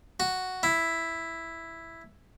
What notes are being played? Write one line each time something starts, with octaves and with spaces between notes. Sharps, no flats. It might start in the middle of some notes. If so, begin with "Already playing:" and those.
F#4
E4